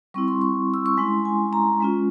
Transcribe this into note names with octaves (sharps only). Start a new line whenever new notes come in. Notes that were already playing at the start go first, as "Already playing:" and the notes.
G3 C4 E4 C#6
C6
C#6
E6
C#6
G#3 C#4 E4 C6
G#5
A#5
G#3 C#4 F4